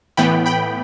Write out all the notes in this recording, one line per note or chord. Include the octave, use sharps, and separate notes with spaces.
A2 E3 B3 G5 B5
G5 B5